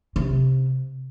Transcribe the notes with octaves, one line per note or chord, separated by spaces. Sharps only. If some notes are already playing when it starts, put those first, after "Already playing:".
C3